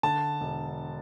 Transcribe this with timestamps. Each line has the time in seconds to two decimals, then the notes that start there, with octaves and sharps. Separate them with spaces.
0.03 D3 A5
0.40 E1